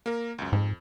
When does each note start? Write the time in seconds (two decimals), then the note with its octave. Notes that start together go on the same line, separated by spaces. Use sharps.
0.06 A#3 A#4
0.38 C#2 F#2
0.53 F2 G#2